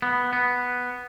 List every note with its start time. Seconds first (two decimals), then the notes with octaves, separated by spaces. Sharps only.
0.02 B3
0.33 B3